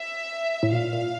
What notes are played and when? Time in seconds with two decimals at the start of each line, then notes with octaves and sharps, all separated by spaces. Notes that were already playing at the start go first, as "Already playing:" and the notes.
Already playing: E5
0.63 A2
0.72 A#2 F5
0.92 A#2